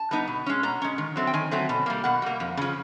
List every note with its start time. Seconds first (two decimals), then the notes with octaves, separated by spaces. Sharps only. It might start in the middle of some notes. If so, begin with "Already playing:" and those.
Already playing: A5
0.11 G3 B3 D#4
0.28 B2
0.46 G#3 C#4
0.63 B2 A#5
0.82 G#3 C#4
0.98 D#3
1.16 F#3 A3 C4
1.27 G5
1.34 D#3 G#5
1.51 F#3 A3 C4
1.69 B2
1.86 G3 A#3
2.04 B2 F#5
2.22 G3 A#3
2.40 F2
2.57 C#3 F3